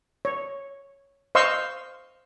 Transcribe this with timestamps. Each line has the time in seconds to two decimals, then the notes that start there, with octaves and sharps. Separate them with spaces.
0.25 C#5
1.35 C5 D#5 F5 C6 C#6 E6